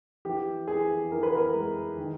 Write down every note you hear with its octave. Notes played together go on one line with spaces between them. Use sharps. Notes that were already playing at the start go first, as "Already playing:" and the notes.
E3 G4
E3 G#4
E3 A#4
B4
A#4
G#3
D#3